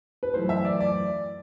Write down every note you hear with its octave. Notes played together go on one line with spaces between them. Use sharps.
B4
F#2 E3 A3 C5
E5
D5
D5